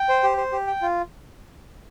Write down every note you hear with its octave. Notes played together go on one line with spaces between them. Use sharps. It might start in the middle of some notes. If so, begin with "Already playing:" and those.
Already playing: G5
C5
G4
C5
G4
G5
F4